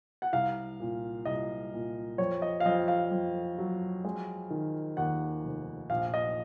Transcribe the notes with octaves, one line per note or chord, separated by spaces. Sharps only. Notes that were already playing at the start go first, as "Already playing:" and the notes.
F#5
C2 F5
A#2
C2 D#5
A#2
F2 C#5
D#5
F5
F2 D#5
F5
F2
F#3
G#3
D#3
D#2 F#5
F1
A#1 F5
D#5